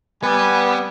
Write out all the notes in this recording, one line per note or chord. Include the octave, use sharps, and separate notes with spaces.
G3 B3 B4 G#5